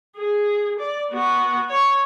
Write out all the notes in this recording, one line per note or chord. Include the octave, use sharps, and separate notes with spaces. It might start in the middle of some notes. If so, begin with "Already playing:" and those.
G#4
D5
B3 F#4
C#5